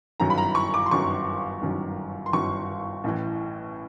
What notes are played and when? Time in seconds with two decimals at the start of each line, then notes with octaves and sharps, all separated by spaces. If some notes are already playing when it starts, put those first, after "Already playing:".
0.20 G1 F#2 D#3 F#3 A#5
0.30 B5
0.38 A#5
0.55 C#6
0.74 D6
0.86 C6
0.91 G1 F#2 D#3 F#3 C#6
1.62 G1 F#2 D#3 F#3
2.26 C6
2.33 G1 F#2 D#3 F#3 C#6
3.04 A1 A2 E3